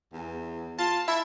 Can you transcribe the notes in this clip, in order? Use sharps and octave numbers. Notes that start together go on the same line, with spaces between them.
E2
F4 A5
E4 E5